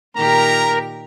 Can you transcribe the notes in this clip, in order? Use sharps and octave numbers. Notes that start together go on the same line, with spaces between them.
A#2 D#3 G4 A#4 A#5